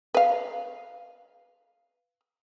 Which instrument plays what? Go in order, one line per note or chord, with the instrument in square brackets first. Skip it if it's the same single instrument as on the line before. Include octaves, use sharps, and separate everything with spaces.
[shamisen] B4 F5